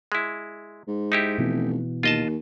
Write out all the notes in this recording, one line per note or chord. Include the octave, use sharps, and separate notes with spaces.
G#3 E4
G#2
D#4 E4 G4
F1 B2 E3
D#2 F4 D#5 A5